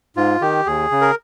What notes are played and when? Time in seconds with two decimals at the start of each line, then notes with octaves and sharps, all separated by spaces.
0.17 G#2 F4
0.41 D#3 G4
0.66 D#2 G#4
0.91 C#3
1.01 A#4